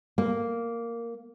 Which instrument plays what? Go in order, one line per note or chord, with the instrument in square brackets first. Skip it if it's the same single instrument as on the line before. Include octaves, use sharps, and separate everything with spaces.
[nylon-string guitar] A#3